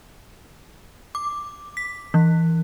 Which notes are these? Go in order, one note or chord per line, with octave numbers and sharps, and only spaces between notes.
D6
B6
E3